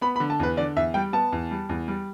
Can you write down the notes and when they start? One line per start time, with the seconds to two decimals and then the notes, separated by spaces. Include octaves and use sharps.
0.01 B3 B5
0.16 B5
0.20 D3
0.30 A5
0.40 E2 B4
0.57 D3 D5
0.76 E2 E5
0.94 G3 G5
1.13 B3 A5
1.32 E2
1.51 G3
1.69 E2
1.88 G3